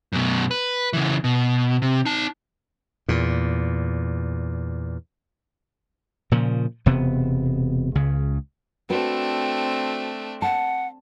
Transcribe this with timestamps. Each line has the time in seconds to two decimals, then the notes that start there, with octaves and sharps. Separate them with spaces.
0.13 F#2 B2
0.51 B4
0.93 C#3 E3
1.24 B2
1.82 C3
2.06 D#4 A5
3.08 E2 A#2
6.32 A#2 C#3 F3
6.86 E1 C3 B3
7.95 C#2 C#3
8.90 A3 C4 D4 F#4 B4
10.42 F#5 A5